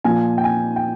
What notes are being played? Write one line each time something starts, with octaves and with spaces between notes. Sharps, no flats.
A#2 F3 G#5
G5
G#5
G5